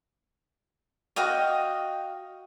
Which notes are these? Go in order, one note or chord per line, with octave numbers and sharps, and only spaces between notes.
F#4 D#5 F5 G5